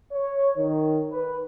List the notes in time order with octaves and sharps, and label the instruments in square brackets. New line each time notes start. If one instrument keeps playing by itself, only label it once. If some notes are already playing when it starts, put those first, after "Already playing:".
[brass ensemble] C#5
D#3
B4